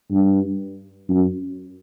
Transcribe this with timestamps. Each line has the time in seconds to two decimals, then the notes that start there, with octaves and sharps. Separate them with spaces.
0.12 G2
1.09 F#2